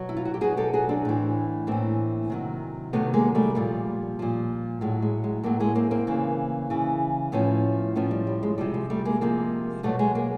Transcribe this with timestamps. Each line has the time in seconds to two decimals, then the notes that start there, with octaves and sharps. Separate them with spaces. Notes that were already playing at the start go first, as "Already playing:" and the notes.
Already playing: B2 F#3
0.09 E4
0.17 F4
0.25 F#4
0.34 G4
0.41 B2 F#3 F#4 G#4
0.57 G4 A4
0.73 F#4 G#4
0.89 C4 D4
1.05 A2 E3
1.67 A2 E3 A#3 C4
2.30 C3 D#3 F#3
2.93 C3 D#3 F#3 A3 B3
3.14 G#3 A#3
3.35 G3 A3
3.55 A#2 F3 G3
4.19 A#2 F3
4.81 A2 F#3 G#3
5.02 G#3
5.24 G#3
5.43 A2 F#3 G#3 A#3
5.60 G#3 A#3
5.75 A#3 C4
5.91 A#3 C4
6.07 C#3 E3
6.70 C#3 E3
7.32 A2 F3 B3 C#4
7.96 A2 F3 B3 C#4
8.11 G3
8.27 G3
8.43 G#3
8.58 C3 F3 G3
8.74 G#3
8.90 G3 A3
9.05 G#3 A#3
9.21 C3 F3 G#3 A#3
9.83 B2 F#3 G3 A3
9.99 G#3
10.15 G#3 A#3